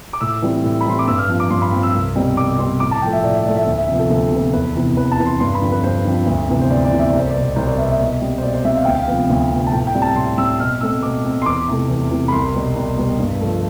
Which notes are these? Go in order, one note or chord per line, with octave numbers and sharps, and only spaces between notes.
D6
A2 E6
E3 G3 C4
A2
B5
E3 G3 C4 C6
D6
G2 E6
F6
F3 C4
D6
G2 C6
B5
F3 C4
E6
C2
B2 G3 C4
C2 D6
B2 G3 C4 C6
A2 D6
A5
F3 A3 G5
E5
A2 D5
E5
F3 A3 D5
E5
D2
E5
C3 F3 B3
A4
D2 A4
C3 F3 B3
E2 B4
C3 E3 B3
E2 B4
A5
C3 E3 B3
C6
G2 C6
B5
D3 F3 C4
B4
G2 C5
D3 F3 C4
D2
C3 E3 B3
C5
D2 D5
D5
C3 E3 B3
E5
C2 D5
C5
D5
B2 B3
C2 C5
D5
B2 B3 E5
E5
B2
G3 C4
C5
B2 D5
C5
G3 C4 E5
F5
D2 G5
F5
C3 F3 B3
D2
C3 F3 B3
A5
A2 G5
G5
G3 C4
A5
A2 C6
G3 C4 E6
B2 F6
A3 C4 E6
B2 D6
A3 C4
C6
E2 D6
C3 E3 A3
E2
C3 E3 A3
B5
C2 C6
B2 G3 B3
C2
B2 G3 B3
G2
F3 A3